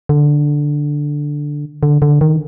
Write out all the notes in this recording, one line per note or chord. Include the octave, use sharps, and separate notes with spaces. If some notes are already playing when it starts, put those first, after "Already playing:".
D3
D3
D3
D#3